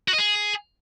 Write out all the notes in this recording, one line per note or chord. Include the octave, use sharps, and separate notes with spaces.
F#4
D#5
G#4